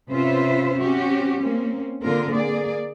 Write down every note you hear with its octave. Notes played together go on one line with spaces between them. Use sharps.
C3 C#4 F4 B4 C5 E5
C4 C#4 F#4 G4
A#3 C4 C#4
D3 A#3 C4 F4 A#4
A#3 G#4 D5